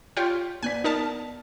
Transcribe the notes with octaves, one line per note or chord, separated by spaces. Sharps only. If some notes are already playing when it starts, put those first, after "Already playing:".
F4 G4 C#5
B3 D5 G#5 F#6 B6
D#4 A#4 A5